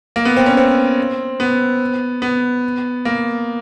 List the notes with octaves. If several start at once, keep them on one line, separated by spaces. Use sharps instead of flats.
A#3
B3
C4
C#4
C4
B3
B3
A#3